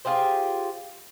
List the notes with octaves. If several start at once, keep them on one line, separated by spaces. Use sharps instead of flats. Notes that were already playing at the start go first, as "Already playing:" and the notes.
F4 G4 G#4 C5